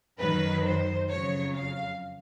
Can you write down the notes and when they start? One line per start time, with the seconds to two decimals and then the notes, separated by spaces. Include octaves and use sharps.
0.18 F#2 D#3 F#3 B4
0.63 C5
1.09 F2 C#3 F#3 C#5
1.54 F5